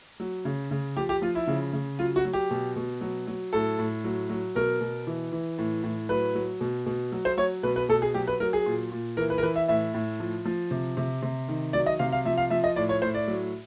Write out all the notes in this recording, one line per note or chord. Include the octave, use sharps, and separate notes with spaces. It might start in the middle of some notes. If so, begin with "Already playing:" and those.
F#3
C#3
C#3
F3 G4
G4
F3 F4
E4
C#3
C#3
F#3 F4
F#4
F#3
G4
B2
B2
F#3
F#3
A2 A4
A2
F#3
F#3
B2 A#4
B2
E3
E3
A2
A2
F#3 B4
F#3
B2
B2
F#3
C5
F#3 C#5
B2 B4
B4
B2 A4
G#4
F#3 G4
B4
F#3 A#4
G#4
A#2
A#2
E3 A#4
B4
A#4
E3 B4
E5
A2 E5
A2
F3
F3
C3
C3
C3
D#3
F#3 D5
D#5
C3 F5
F5
F3 E5
F5
F3 E5
D#5
A2 D5
C#5
A2 C5
D5
F#3